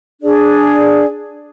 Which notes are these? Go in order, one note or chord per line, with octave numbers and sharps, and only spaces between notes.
D4 G#4 D5